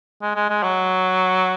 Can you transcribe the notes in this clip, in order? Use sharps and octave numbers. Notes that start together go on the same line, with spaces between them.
G#3
G#3
G#3
F#3